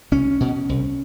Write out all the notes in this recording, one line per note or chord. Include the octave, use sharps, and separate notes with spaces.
C2 C#4
B2
C2